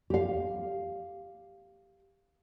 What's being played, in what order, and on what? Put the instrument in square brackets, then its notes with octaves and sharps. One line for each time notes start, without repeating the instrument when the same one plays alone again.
[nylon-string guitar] G4 F5